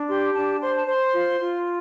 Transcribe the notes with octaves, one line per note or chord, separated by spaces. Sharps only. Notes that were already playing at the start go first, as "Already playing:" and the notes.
Already playing: D4
G4 C6
D4 A5
C5 C6
A5
C5 C6
F4
F4